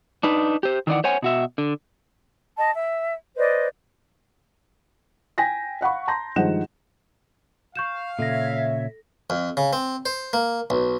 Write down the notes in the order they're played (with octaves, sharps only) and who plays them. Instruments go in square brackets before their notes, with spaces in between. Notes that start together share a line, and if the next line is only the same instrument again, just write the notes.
[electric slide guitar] D4 D#4 B4
G4 C5
D#3 E3 D5 F#5
C5 C#5 F#5 G#5
B2 F#4 E5
D3
[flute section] D#5 A5
E5
B4 C5 D5 D#5
[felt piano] G5 G#5 A#6 B6
F5 F#5 B5 C#6
A5 A#5 C6 G6 A#6
G2 D#3 F3 G#3 F#5 E7
[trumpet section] F5 [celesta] C#6 G6 E7
[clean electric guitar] A#2 C#3 [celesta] A4 A#6 [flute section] C#5 E5
[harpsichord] F2
C#3
C4
C5
A#3
B1